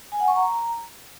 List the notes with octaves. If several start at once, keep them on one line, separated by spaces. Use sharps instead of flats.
G#5
F#5
C#6
A#5